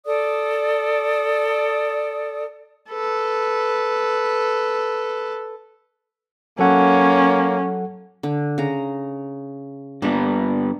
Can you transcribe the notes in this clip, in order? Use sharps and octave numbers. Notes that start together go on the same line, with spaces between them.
A4 D5 D#6
A4 B4
F#3 A#3 C#4 A4 F#5
D3
C#3 A#5
G2 G3 A#3 B3 D4